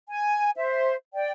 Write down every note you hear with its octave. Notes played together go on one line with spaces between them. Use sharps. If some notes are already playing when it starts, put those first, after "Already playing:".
G#5
C5 E5
D5 G5